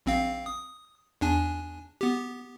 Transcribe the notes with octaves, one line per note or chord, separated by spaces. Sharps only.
A#1 C4 F5
D#6
E2 D4 G#5
B3 G4